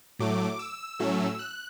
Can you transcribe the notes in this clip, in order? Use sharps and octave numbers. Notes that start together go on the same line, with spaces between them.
A2 F#3 A3 D6
E6
A2 F#3 A3 C#4
F#6